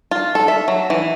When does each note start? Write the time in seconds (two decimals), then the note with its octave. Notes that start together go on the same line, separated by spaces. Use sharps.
0.11 F4
0.35 A4
0.48 E5
0.68 F#3
0.90 E3